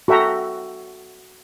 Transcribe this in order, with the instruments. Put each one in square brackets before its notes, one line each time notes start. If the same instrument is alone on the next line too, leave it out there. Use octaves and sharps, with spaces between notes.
[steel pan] F#4 A4 E5 G5 A#5